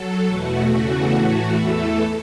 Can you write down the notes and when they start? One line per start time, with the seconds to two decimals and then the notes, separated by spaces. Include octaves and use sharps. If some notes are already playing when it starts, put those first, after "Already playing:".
Already playing: F#3 A4
0.26 E2 B2 A3 F#4
0.70 E2 C#3 E3 A3 F#4
1.13 A2 E3 A3
1.57 E2 E3 A3 A4